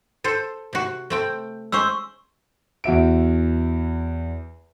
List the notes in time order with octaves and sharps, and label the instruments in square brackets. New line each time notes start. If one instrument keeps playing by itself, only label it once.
[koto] A4 C5
C3 F#4
A3 C4 G5
[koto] G#3 C#4 C5 [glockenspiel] C6 C#6 E6
[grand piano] E2 F#4 E5 D7